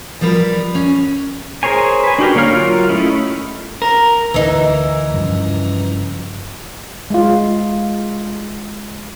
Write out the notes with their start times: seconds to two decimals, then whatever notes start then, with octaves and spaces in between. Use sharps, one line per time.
0.21 F3 G3 A#4 B4
0.75 C#4
1.63 G#4 A#4 C5 C#5 G#5
2.04 B4 G#5
2.19 D4 F#4 G4 A#4
2.35 D3 A#3 C#5 F5 F6
2.52 F#3 F4 A#4
2.89 A3 C#4 E4 F4 D#5
3.82 A#4
4.34 D2 E3 D#4
5.14 G2 C#3 F3
7.10 G#3 F4